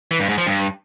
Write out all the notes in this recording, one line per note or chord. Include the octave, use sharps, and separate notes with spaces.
E3
G2
G#2
F3
G2